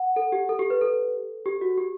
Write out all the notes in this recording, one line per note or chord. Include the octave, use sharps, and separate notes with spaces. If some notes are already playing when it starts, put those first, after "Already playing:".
Already playing: F#5
A4
G4
A4
G4
B4
A4
G4
F#4
G4